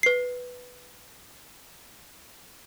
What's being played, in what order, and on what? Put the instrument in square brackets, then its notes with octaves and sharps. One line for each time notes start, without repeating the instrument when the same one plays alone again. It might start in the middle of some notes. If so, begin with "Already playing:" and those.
[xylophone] B4 C7